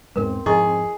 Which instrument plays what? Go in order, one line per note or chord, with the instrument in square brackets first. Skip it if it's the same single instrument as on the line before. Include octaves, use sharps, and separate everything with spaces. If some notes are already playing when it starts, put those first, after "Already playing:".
[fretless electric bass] E2 G#2 G#3 [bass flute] C4 [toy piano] A#4 B4
[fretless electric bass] F2 G#2 F3 [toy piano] E4 D#5 C#6 [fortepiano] G#4